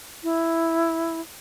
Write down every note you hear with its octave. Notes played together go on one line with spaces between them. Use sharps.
E4